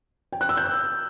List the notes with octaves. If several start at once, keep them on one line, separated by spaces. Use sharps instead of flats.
G5
F#6
E6
G6